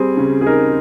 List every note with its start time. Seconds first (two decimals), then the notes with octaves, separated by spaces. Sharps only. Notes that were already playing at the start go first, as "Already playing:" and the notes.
Already playing: G3 C4 G#4
0.17 C#3
0.41 G#4
0.46 D#4 A#4